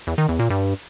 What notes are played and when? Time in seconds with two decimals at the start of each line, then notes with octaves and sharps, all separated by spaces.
0.07 E2
0.18 D#3
0.29 E2
0.39 A#2
0.50 G2